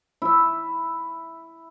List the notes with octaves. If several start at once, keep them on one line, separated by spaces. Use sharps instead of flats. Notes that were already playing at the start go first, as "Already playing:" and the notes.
E4 E5